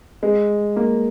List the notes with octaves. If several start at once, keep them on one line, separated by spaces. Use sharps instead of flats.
G#3
A#3